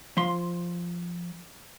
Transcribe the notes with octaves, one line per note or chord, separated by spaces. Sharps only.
F3 C6